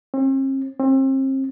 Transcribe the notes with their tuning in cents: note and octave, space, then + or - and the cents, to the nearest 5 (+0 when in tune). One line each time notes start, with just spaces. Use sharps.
C4 +45
C4 +35